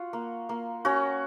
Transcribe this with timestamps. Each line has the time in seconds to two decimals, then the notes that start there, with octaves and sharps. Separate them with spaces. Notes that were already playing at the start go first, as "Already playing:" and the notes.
Already playing: F4 F#4
0.13 A#3
0.49 A#3
0.85 C#4 F#4